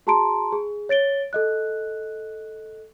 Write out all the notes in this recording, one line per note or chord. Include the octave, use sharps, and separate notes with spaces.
F#4 G#4 A5 A#5 C6 D7
G#4
C#5 A6 D7 G7
A4 D#5 F#6